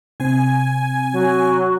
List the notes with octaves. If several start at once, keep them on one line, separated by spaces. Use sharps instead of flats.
C3 C4 G#5
F#3